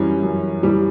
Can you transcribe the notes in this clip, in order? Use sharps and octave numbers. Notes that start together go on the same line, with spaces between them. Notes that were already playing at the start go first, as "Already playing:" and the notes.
Already playing: F#2 E3 G3 C#4
F#2
E3 G3